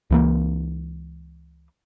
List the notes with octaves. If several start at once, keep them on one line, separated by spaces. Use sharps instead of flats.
C#2 E3 A#3